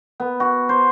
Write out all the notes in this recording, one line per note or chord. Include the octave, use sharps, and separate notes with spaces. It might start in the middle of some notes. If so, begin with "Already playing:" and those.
B3
F#4
C5